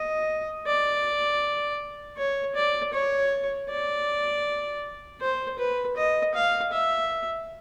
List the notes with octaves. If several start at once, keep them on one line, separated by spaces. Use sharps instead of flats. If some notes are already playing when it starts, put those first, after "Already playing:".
Already playing: D#5
D5
C#5
D5
C#5
D5
C5
B4
D#5
F5
E5